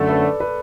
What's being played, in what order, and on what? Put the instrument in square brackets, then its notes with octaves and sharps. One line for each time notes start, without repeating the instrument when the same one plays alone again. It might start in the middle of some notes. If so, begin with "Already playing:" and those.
Already playing: [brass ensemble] F#2 D3 A3 [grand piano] A4
[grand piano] B4
D5
B4